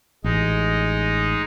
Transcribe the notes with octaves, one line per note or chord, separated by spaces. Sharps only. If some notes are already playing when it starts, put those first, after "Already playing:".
A1 G#3 D#4